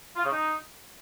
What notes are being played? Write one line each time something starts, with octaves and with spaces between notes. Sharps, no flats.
F4
C#3
D#4